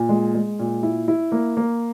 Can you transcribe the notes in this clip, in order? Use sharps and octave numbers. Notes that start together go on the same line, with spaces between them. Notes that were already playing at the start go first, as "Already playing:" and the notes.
Already playing: A#2
G#3
G#3
A#2
E4
E4
A#3
A#3